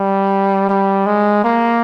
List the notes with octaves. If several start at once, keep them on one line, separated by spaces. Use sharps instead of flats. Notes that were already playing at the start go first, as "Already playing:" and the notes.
Already playing: G3
G3
G#3
A#3